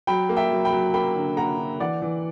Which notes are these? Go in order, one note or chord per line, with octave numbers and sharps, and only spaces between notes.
F#3 G5 B5
A#3
E5 G5
F#3
G5 B5
F#3
A#3 G5 B5
D3
A#3 F#5 A#5
D3
E3 D5 F#5
E3